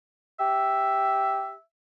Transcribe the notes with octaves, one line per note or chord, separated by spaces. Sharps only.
G4 E5